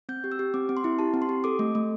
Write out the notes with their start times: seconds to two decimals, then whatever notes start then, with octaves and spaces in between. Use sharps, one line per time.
0.09 C4 G6
0.24 G4
0.32 E6
0.39 G4
0.54 C4 D6
0.69 C4
0.77 C6
0.84 E4
0.99 G4 A5
1.14 C4
1.22 C6
1.29 G4
1.44 A4 D6
1.59 A3
1.75 A3